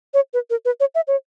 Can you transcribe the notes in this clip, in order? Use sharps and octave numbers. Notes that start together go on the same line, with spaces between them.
C#5
B4
A#4
B4
C#5
E5
C#5